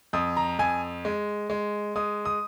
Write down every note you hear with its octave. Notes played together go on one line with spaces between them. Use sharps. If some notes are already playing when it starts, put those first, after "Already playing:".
F2 D#6
A#5
F2 G#5
G#3
G#3
G#3 D#6
D#6